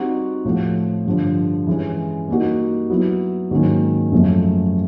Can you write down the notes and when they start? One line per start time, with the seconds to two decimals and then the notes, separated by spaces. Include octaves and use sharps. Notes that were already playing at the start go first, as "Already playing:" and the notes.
Already playing: G3 C4 D#4 F#4
0.45 A2 F3 A3
1.06 G2 D3 F3
1.67 E3 G#3 C#4
2.28 G3 A#3 D#4 F#4
2.90 F#3 B3 E4
3.51 G#2 D#3 F#3 A#3 C#4
4.12 F#2 C#3 F3 A3